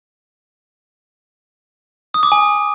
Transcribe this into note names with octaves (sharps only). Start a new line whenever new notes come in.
D#6
D6
G#5